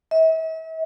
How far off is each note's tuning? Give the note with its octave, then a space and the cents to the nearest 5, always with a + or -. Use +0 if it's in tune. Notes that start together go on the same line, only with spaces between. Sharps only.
E5 -40